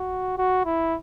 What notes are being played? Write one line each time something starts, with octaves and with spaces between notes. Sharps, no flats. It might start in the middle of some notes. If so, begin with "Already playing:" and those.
Already playing: F#4
F#4
E4